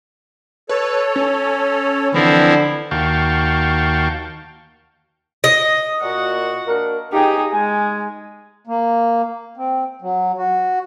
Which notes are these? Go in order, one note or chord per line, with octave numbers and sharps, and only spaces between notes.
A4 B4 C#5
C#4
D3 E3 F3 C4 E4
D#2 F#4 F5 G5 A5 C#6
D#5
A#2 F#4 F#5
A#3 D4 A#4
C#2 D#4 F4 G4 G#4
G#3 G#5
A#3
C4
F#3
F#4